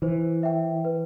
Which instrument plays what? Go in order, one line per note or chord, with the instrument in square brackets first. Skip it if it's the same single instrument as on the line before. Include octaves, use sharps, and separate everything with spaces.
[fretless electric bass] E3 [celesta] C5
[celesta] E5 G5
B4